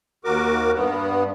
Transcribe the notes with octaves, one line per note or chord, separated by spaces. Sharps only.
D#2 F#4 A#4 D6
G2 B3